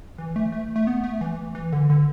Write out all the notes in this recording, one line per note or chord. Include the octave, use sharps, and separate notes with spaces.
E3
A3
A3
A3
B3
A3
E3
E3
D3
D3